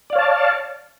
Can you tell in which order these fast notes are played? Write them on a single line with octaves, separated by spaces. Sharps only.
D5 F5 C#5 A5